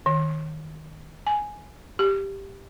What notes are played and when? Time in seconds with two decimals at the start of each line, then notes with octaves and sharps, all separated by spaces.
0.06 D#3
1.27 G#5
1.99 G4